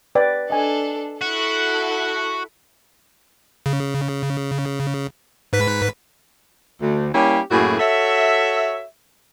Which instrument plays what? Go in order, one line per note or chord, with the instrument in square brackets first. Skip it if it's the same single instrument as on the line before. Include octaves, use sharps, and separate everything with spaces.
[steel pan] B4 D5 G5
[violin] D4 A4 [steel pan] D#5 G#5
[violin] E4 A4 [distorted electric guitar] F#4
[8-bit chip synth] C#3
G#2 B4 B6
[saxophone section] D2
G3 A#3 C#4 E4 G4
F#2 A2 A#3 E4 F#4 G#4
F#4 A4 C#5 E5